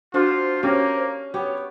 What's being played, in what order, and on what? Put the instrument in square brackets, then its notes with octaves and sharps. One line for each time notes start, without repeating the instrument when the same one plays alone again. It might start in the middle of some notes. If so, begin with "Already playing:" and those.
[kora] D4 F#4 A4 [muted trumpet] F4 [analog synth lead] C5
[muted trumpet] A#3 [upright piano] C#4 [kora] G4
[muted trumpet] B3 [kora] G4 [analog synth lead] C#5